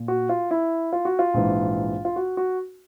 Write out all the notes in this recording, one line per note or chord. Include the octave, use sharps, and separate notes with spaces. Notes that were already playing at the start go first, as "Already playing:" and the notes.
Already playing: A#2
F#4
F4
E4
F4
F#4
F4
A#1 G#2 E3
F4
F#4
F#4